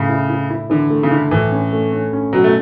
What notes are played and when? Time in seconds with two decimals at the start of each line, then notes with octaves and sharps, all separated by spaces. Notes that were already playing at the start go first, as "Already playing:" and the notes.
Already playing: A2 C#3
0.09 E4
0.29 E4
0.50 E4
0.70 D3 E3
0.90 A3
1.03 C#3
1.11 D3 E4
1.31 A2 E3
1.52 C#4
1.72 A3
1.92 C#4
2.13 C#4
2.33 B2 F#3
2.44 A3